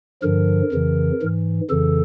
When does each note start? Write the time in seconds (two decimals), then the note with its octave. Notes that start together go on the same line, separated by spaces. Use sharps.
0.22 G2 D3 F3 A#4
0.72 F2 C#3 E3
1.22 G#2 E3
1.70 F2 C#3 E3 A4